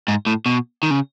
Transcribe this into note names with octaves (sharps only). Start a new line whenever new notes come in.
G#2
A2
B2
D#3
C#3